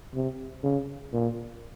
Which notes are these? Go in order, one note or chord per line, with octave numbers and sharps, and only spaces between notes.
C3
C#3
A#2